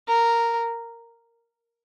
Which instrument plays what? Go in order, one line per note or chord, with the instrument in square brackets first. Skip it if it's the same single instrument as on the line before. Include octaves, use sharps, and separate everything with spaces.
[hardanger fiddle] A#4